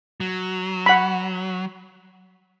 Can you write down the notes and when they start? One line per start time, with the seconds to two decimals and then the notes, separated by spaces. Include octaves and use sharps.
0.20 F#3
0.86 F#5 B5